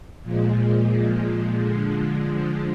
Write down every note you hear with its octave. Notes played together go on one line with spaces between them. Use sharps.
A#2 F3 G#3
D3 F3 G#3